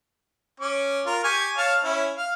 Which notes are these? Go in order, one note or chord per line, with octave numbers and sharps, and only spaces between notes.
C#4 D6
F4 A#4
G4 G#5 C#6
C#5 F5 A5
C#4 E4
F5